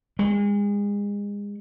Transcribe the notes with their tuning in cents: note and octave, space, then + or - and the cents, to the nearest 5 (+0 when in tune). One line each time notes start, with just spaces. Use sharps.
G#3 -35